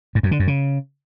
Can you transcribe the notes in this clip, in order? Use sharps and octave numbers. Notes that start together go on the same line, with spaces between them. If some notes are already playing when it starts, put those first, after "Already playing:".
G#2
F#2
D3
F#2
C#3